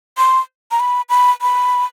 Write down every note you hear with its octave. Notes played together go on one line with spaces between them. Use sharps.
C6
A#5
B5
B5
B5